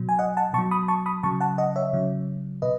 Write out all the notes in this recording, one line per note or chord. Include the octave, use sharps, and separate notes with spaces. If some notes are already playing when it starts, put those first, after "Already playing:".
Already playing: B2 F#3
G#5
D#5 F#5
F#5 A5
B2 F#3 A5 C#6
B5 D#6
A5 C#6
B5 D#6
C#3 F#3 A5 C#6
F#5 A5
D#5 F#5
C#5 E5
C#3 F#3
B2 B4 D#5